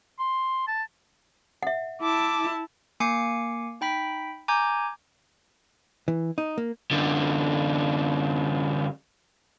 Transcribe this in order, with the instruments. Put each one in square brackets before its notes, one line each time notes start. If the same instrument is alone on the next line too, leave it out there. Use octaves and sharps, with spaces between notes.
[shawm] C6
A5
[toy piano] E5 F#5
[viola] E4 A5 [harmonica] D6
[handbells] A#3 G#5 D6 C7 C#7
D#4 G5 B5 B6
G#5 A#5 D6 G6 G#6
[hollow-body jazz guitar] E3
D#4
A#3
[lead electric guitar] F#2 D3